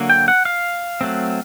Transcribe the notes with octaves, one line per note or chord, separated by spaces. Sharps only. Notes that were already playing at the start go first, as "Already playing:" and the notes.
Already playing: D3 F#3 A#3
G5
F#5
F5
F#3 A3 C4